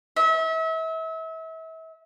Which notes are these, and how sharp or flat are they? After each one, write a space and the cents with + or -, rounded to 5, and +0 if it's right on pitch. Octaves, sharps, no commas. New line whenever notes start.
E5 -35